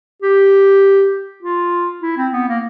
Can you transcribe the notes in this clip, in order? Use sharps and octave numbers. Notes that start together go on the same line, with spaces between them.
G4
F4
E4
C4
B3
A#3